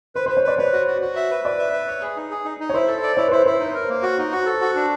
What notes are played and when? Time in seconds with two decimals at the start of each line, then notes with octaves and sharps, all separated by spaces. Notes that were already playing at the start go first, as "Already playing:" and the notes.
0.15 B4 C5
0.26 C5
0.29 B4
0.37 C#5
0.44 B4 D5
0.58 B4 C#5
0.73 F#4
0.87 F#4
1.01 F#4
1.16 E5
1.31 B4
1.45 B4 D5
1.59 E5
1.73 B4
1.87 C#5
2.01 G#4
2.17 D#4
2.31 G#4
2.45 D#4
2.60 D#4
2.69 C#5
2.74 E4 C5
2.88 A4
3.03 D5
3.17 E4 C#5
3.27 B4
3.32 E4 C5
3.46 E4 C5
3.60 D#4
3.74 A#4
3.89 A#3
4.03 F#4
4.18 D#4
4.32 F#4
4.46 A4
4.61 F#4
4.75 D4